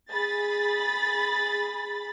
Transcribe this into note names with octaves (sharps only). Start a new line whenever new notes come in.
G#4 B5 A6